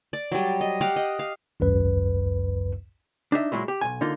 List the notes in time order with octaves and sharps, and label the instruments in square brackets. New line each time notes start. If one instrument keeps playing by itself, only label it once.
[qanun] D5
F#3 G3
D#5
G4 F5 F#5
D#5
F5
[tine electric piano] G#1 C#2 F#2 B4
[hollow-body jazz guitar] D4 D#4 E5
A#2 F#3 G#3 E4
G4
B1 F2 G#5
D3 A#3 D#4 F4